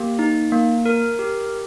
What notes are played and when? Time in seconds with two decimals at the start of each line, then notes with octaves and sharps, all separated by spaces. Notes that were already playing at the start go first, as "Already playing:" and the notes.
Already playing: A#3 G4
0.19 D#4
0.52 A#3
0.86 A#4
1.19 G4